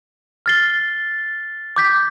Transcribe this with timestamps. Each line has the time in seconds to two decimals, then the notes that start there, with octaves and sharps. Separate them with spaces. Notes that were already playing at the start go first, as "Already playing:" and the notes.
0.46 F6 A6 C7 G7
1.76 D6 G6 B6